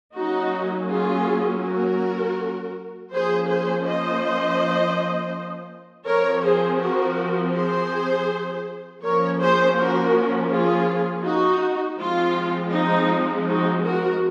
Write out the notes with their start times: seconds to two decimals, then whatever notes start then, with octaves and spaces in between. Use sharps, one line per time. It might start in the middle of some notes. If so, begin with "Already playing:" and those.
0.15 F#3 A#3 C#4 D#4 F#4
0.90 F4 G#4
1.63 F#4 A#4
3.11 F3 A#3 C#4 G#4 C5
3.48 G#4 C5
3.85 C5 D#5
6.06 F3 C4 A#4 C#5
6.44 G#4 C5
6.80 F#4 A#4
7.55 G#4 C5
9.03 F3 A#3 C#4 A#4 C#5
9.39 G#4 C5
9.76 F#4 A#4
10.51 F4 G#4
11.24 D#4 F#4
11.98 F3 G#3 C4 F4
12.72 D#4
13.46 D#4 F#4
13.83 F#4 A#4